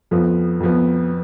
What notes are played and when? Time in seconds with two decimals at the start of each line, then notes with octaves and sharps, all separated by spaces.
0.11 F2 F3 B3
0.60 F2 F3 B3